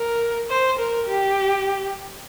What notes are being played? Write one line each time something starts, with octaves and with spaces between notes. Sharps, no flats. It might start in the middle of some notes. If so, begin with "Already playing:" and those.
Already playing: A#4
C5
A#4
G4